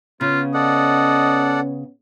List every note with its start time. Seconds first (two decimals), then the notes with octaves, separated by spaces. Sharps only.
0.21 C#3 B3 C#4 F4
0.54 A4 D5 D#5 F#5